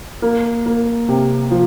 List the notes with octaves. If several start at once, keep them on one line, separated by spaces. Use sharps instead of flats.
A#3
A#3
C3
F3